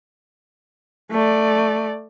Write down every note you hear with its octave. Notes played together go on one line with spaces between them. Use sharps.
A3 D5